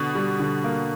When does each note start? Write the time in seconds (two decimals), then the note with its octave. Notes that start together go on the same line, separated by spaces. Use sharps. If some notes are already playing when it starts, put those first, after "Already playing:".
Already playing: B2 D3
0.15 G3
0.39 D3
0.64 A#3